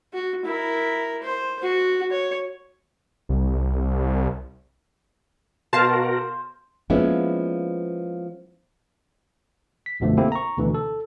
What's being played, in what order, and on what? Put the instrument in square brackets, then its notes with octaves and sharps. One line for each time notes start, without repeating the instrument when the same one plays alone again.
[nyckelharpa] F#4
E4 A#4
C5
F#4
C#5
[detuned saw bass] C2
[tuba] B2 [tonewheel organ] F#4 A#4 [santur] C5 [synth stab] F5 A5
[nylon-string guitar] F3 G#3 A#3 B3 C#4 E4
[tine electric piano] B6
B1 F#2 B2 D3 F3 A3
A#3 C4 E4 G4 A4
A#5 C#6
D2 B2 D3 E3
A4